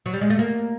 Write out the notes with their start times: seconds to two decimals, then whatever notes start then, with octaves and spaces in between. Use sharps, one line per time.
0.06 F#3
0.13 G3
0.21 G#3
0.30 A3
0.39 A#3